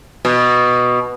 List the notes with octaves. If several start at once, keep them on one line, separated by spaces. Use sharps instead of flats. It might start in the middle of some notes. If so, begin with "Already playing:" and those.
B2